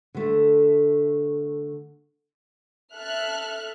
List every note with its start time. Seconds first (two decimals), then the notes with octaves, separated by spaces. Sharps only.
0.14 D3 A3
2.94 A4 E5 F6 F#6